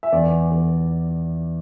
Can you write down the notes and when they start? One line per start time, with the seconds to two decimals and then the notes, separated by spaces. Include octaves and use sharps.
0.03 E5
0.12 E2 D5
0.51 E2